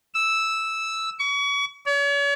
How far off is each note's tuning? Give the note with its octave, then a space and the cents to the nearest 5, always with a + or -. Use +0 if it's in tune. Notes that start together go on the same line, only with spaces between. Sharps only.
E6 -5
C#6 +35
C#5 +40